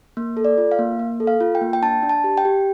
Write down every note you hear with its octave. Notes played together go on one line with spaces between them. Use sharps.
A#3
A4
D5
F4
F5
A#3
A#3
A4
F5
F4
G5
A#3
G5
D4 A5
D4
A5
G4
G5
G4